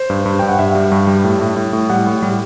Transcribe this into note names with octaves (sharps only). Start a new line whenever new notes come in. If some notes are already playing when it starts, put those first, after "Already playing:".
Already playing: C5
G2
G2
G2 G5
F#5
G2 E5
G3
G2
G3
A2
A2
A2
A2
G3 F#5
A2
G3